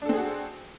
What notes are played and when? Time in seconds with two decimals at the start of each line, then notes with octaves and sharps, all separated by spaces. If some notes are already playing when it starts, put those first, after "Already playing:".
0.02 D4
0.05 A4
0.09 C4
0.13 G#4
0.17 F#4